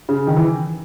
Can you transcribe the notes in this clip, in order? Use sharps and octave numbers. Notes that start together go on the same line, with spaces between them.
C#3
D#3
E3